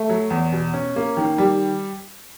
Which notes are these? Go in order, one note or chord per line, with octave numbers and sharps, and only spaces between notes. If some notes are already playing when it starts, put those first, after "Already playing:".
Already playing: A3
F#3
E2
B2
C#4
A#3
D#3
G3